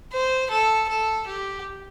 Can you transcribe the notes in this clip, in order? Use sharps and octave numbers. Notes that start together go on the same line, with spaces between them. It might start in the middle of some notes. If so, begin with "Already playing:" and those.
C5
A4
A4
G4